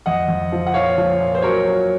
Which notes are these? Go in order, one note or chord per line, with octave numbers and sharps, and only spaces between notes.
F2 D#5 F#5
F2
F3
F#5
A#2 C#5 F5
F3
A#2
C5
F#3 A#4 C#5
F#3